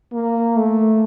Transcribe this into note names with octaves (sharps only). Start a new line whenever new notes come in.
A#3
A3